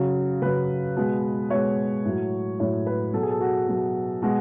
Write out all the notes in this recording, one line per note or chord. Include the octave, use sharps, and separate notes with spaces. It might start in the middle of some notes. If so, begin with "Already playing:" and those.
Already playing: C#3 F#3
C#3 F#3 B4
B2 G#3
B2 G#3 C#5
A2 F#3
A2 F#3 C#5
B4
B2 F#3 A4
G#4
A4
F#4
B2 F#3
B2 G#3 F#4